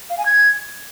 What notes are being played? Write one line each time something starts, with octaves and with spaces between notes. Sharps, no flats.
F5
G#5
G#6